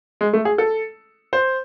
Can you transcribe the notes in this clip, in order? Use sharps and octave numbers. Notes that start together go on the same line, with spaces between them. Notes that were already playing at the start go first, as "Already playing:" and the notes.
G#3
A3
G#4
A4
C5